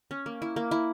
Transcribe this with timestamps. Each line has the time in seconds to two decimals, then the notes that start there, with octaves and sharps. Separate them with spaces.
0.11 C#4
0.26 A#3
0.42 E4
0.56 A#3
0.71 E4